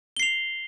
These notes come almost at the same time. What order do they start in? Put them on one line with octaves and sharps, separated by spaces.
G7 C7 F7